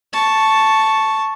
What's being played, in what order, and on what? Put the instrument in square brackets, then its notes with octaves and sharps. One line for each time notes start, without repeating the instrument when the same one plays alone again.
[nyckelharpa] A5 C#6